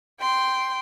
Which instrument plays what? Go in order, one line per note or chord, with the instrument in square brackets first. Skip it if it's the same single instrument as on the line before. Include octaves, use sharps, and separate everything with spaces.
[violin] G5 C6